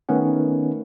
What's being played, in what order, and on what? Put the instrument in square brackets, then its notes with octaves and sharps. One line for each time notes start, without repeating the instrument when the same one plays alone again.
[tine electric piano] D#3 A3 B3 C#4 F#5